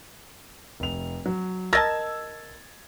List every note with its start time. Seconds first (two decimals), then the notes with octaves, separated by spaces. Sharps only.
0.80 F1 F7
1.26 F#3
1.73 A#4 D#5 A5 E6 G#6 A6